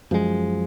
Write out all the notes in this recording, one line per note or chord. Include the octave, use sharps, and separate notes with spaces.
F#2 F3 G#3